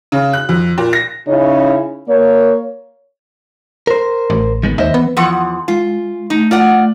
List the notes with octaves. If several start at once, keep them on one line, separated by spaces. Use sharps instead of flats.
C#3
F#6
F2
A#2
A#6
C#3 C#4 D#4 E4 C#5
A#3 C#5
A#4 C5
A1
D#3 G#3 B3
D#2 C5 D#5 E5
E3 B3
E2 F3 F#5 C6
G#3 F4
A3 D#4
F4 D5 F#5